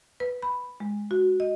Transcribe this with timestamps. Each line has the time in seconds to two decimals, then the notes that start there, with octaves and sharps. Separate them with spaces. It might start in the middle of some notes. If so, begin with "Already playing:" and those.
0.20 B4
0.42 B5
0.80 G#3
1.11 F#4
1.40 D#5